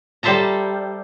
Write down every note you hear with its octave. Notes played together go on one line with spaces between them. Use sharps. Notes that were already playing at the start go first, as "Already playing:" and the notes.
G3 A4 C5 E5 A5 A#5